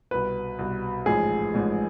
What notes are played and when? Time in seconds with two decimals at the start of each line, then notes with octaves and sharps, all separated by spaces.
0.11 C2 B2 B4
0.59 C2 B2
1.06 A1 G#2 F3 G#4
1.54 A1 G#2 F3